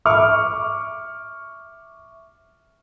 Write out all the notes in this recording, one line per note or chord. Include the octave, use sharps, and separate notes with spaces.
E5 C#6 D6 F6